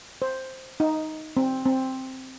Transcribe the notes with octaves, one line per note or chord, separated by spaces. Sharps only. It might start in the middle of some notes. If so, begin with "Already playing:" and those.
C5
D#4
C4
C4